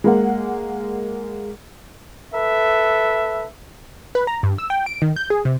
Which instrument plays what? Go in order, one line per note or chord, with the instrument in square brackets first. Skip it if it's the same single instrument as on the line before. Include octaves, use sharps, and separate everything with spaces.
[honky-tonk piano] G#3 A#3 F#5
[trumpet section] A4 B4 E5
[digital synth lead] B4
A#5
G2
E6
G5
D7
D#3
G6
G#4
C3